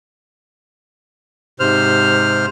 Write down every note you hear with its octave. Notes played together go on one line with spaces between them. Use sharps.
G#2 C3 C5 F6